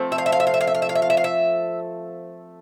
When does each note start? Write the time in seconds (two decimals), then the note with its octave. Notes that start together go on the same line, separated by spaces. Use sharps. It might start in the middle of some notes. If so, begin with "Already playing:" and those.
Already playing: F3 A3 C4
0.12 E5
0.18 F5
0.26 E5
0.32 F5
0.40 E5
0.47 F5
0.54 E5
0.61 F5
0.67 E5
0.75 F5
0.82 E5
0.89 F5
0.95 E5
1.02 F5
1.10 E5
1.17 F5
1.24 E5